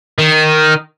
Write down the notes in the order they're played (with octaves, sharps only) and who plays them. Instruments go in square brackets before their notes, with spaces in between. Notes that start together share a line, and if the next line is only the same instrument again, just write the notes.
[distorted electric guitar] D#3